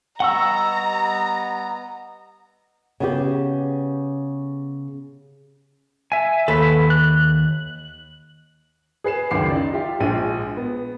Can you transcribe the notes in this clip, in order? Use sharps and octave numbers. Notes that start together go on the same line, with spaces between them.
G3 B3 G4 D#5 F#5 A#5 C#6 E6
C#3 B3 G4
E5 G#5
D#2 A4 B4 B5
F#6
G#4 B4 C7 E7
C#2 F#2 D#3 D6 C7
D#4 D5
F4 G4 E5
A#1 F3 G#3 D#7
B3